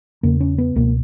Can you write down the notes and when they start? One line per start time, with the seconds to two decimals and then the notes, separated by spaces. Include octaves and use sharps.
0.23 E2 C#3 A#3
0.40 C#4
0.58 B3
0.76 C#2 B2 A#3